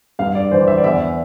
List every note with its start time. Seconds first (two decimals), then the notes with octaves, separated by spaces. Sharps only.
0.19 G2 F5
0.35 D5
0.51 E3 C5
0.61 D5
0.67 E5
0.78 D5
0.84 E2 E5